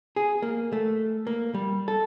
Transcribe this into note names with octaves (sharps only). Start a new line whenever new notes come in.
G#4
A#3
A3
A#3
G3
A4